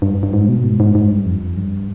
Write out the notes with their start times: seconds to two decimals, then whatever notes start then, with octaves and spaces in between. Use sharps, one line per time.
0.02 G2
0.23 G2
0.33 G#2
0.49 B2
0.64 G#2
0.80 G#2
0.95 G#2
1.10 G2
1.25 F2
1.56 G2